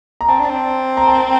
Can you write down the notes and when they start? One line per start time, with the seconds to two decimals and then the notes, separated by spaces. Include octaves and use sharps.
0.21 A#5
0.29 C4 A5
0.40 D4
0.49 C4
0.97 A#5
1.07 A5